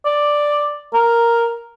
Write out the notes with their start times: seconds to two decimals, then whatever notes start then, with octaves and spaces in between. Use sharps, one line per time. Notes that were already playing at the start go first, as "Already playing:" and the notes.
0.05 D5
0.94 A#4